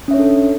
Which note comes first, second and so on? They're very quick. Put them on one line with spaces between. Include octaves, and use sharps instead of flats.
C#4 E5 C#5 D4 A4